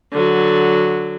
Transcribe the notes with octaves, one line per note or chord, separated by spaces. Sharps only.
D3 F#3